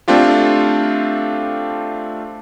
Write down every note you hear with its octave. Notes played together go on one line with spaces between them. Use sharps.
A3 C4 D4 F4 G4